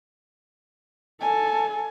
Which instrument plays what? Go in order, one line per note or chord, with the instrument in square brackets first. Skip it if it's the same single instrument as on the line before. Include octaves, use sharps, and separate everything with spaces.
[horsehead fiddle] A4 [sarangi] G#5